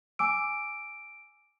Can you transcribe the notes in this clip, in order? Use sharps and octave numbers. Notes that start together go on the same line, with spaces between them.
G#5 D6 E6 D7